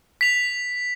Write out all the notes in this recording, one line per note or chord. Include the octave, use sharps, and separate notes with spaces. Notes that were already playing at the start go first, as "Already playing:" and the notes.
B6 F7